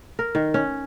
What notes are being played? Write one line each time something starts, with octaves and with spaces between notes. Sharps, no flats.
A#4
D#3
C#4